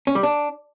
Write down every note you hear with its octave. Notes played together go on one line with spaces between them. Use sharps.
C#4
G3
D4